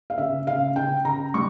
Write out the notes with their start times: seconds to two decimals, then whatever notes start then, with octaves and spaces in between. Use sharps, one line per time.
0.10 F5
0.18 C#3 E5
0.47 C#3 F5
0.76 C#3 G5
1.05 C#3 A#5
1.34 G3 C#6